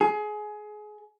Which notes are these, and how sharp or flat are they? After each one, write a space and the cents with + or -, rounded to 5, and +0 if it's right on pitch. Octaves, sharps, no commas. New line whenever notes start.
G#4 +25